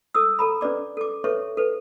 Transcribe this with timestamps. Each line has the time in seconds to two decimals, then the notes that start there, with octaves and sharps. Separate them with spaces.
0.14 A4 D#6 E6
0.39 A4 A#5 B5
0.61 C#4 B4 D5 D6
0.97 A4 D6
1.24 A4 B4 C#5 E5 C#6
1.57 A4 B4